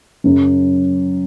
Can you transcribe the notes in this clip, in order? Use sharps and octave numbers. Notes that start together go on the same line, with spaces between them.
F#2 C#3 F#3